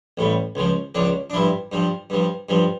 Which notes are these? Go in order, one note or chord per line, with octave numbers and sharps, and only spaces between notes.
A1 A2 G3
C#2 C#3 F3
C#2 C#3 F3 D4
D4
G2 F3 E4
G2 F3
G2 F3
G2 F3